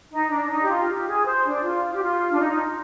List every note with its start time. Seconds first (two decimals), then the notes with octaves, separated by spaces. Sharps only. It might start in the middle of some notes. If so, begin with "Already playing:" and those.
0.11 D#4
0.30 D4
0.49 D#4
0.60 G4
0.69 F4
0.87 G4
1.07 G#4
1.26 C5
1.44 D4
1.63 F4
1.93 G4
2.01 F4
2.30 D4
2.39 D#4